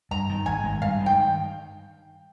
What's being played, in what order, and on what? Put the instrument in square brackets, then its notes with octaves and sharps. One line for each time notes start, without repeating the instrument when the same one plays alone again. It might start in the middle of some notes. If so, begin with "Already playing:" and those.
[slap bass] G2 [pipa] A#5
[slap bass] D#3
[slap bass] G#1 [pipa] G#5
[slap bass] G#3
[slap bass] G2 [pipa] F5
[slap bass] D#3
[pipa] G5